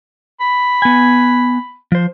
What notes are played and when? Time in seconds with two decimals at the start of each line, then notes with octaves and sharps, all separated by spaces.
0.40 B5
0.82 B3 G#5
1.92 F3 C5